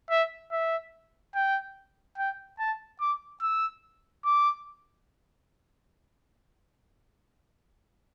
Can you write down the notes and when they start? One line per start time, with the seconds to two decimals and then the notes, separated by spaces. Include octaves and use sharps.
0.10 E5
0.52 E5
1.35 G5
2.18 G5
2.59 A5
3.01 D6
3.42 E6
4.25 D6